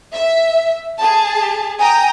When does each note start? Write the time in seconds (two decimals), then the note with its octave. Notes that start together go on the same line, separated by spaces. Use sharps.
0.14 E5
1.00 G#4 A5
1.79 G5 G#5 A#5 D#6